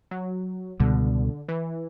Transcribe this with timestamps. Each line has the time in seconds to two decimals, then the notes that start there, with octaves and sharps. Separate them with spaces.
0.11 F#3
0.80 C#2 B2 D3 G3
1.48 E3